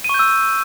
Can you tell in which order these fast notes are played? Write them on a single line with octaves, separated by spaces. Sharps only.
D#7 C#6 G6 E6